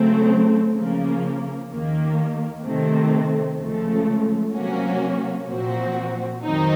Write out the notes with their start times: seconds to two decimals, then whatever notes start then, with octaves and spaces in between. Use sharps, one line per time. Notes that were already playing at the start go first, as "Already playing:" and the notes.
Already playing: C#3 F#3 A3 C4
0.73 C#3 F3 A#3
1.69 D#2 D#3 A#3
2.63 C3 D#3 A3 C4
3.57 C#2 C#3 F3 A3
4.53 C3 F#3 A#3 C#4 F#4
5.47 A#2 F3 C4 F#4
6.42 F2 D#3 F#3 C4 D#4